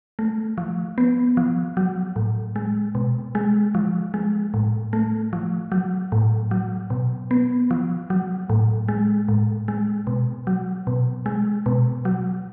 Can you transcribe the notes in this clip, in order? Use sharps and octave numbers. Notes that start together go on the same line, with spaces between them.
A3
F3
B3
F3
F#3
A2
G#3
B2
G#3
F3
G#3
A2
A3
F3
F#3
A2
F#3
B2
B3
F3
F#3
A2
G#3
A2
G#3
B2
F#3
B2
G#3
B2
F#3